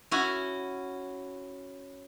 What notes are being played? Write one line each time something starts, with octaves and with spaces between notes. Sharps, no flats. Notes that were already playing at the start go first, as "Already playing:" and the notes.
C#4 E4 F#4